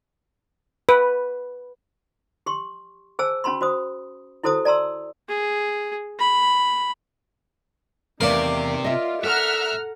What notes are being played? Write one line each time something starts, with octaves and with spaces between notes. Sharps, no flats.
B4
G4 C6 C#6
G#4 C5 G#5 A5 E6
C#4 F#4 A5 B5 C6
F#4 C5 D#6
E4 F#4 A4 C5 A5 D#6
D5 A5 A#5 C6 E6
G#4
B5
E2 C3 D#3 A3 A#4 D5 F5
F4 D#5 E5
A4 E5 F#5 A#5 F6